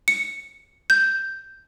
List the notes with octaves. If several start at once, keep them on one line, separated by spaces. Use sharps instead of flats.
C#7
G6